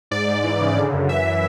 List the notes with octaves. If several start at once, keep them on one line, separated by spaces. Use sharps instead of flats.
G#2 D5
G#2
E3
C#3
D3
F#2
E3 E5
E3